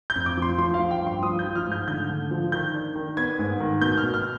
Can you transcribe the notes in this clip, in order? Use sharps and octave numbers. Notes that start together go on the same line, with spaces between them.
G6
F2
D6
F3 C6
F3 C6
F5
F3
G5
G2
C6
F3 D#6
G6
F3
F6
G#2
G6
D3 G6
D3
F3
D#3 G6
D4
D#3
B3 G#6
G#2
D#3
B2 G6
F6
B2
F6